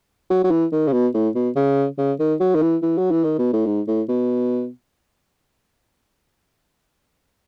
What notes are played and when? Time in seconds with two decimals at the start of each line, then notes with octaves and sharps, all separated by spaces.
0.30 F#3
0.44 F#3
0.51 E3
0.72 D#3
0.88 C#3
0.93 B2
1.14 A2
1.35 B2
1.56 C#3
1.98 C#3
2.20 D#3
2.40 F#3
2.55 D#3
2.62 E3
2.82 E3
2.98 F#3
3.11 E3
3.24 D#3
3.38 B2
3.53 A2
3.66 G#2
3.87 A2
4.09 B2